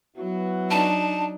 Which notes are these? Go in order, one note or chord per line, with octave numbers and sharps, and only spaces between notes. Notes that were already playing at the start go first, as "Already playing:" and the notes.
F#3 B3 E4 F#4
D4 D#4 A5